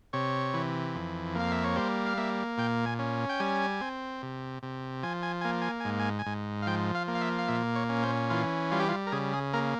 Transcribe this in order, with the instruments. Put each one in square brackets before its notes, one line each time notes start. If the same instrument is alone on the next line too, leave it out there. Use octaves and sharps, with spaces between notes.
[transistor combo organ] C3 C#5
E3
F2
A#3 F5
E5
C#5
G3 C5
F5
A#3 E5
A#2 G5
G#5
C#4
G5
G3 G#5
C4
C3
C3
F3 G#5
G#5
A#3 G#5
G#5
G#5
G#2
G#5
G#5
G#2
F5
F3 G5
F5
A#3
F5
E5
F5
A#2 E5
C#5
C#4
C5
E3 F4
G3 F4
G4
F4
A#4
C#3 G#4
G#4
A#3 A#4